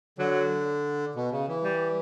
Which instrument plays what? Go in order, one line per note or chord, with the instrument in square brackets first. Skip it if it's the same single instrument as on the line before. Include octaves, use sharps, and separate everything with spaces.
[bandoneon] D3 [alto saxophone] F#3
[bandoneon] B2
C#3
E3
[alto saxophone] G3